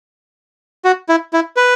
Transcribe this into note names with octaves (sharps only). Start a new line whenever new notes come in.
F#4
E4
E4
B4